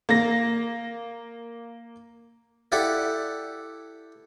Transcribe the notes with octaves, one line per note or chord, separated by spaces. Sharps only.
A#3 A#6
E4 G4 A4 D5 E5 F#5